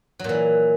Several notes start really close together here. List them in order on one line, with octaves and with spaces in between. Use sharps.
F#3 A#2 E3